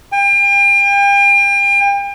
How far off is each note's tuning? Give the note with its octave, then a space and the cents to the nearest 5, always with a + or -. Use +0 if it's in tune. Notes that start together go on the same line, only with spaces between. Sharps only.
G5 +40